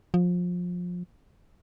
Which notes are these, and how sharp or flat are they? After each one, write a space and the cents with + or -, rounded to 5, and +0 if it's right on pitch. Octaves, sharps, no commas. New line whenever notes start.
F3 +25